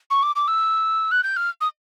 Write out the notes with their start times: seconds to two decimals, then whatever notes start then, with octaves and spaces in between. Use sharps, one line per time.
0.10 C#6
0.23 D6
0.36 D6
0.48 E6
1.11 F#6
1.23 G6
1.36 F6
1.61 D#6